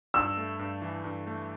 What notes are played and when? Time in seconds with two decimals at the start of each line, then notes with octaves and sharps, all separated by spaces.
0.14 G2 E6
0.37 A3
0.59 G2
0.82 E3
1.04 G2
1.27 A3